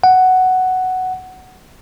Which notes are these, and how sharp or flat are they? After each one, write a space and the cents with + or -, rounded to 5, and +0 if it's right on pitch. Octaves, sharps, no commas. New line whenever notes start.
F#5 +5